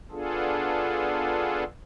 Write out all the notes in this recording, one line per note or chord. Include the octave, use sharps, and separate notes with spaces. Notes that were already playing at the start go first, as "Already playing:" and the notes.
B3 D4 F4 G#4 A4